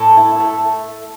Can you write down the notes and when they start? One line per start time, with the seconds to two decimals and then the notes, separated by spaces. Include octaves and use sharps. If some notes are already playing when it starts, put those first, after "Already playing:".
Already playing: A2 A4
0.17 E4
0.40 A3